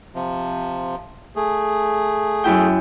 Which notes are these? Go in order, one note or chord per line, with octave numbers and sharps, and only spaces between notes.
C3 F3
A3 G#4
F#2 E4 G5